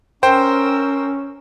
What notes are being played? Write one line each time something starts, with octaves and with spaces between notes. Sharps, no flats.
C#4 A#4 C5 G5 E6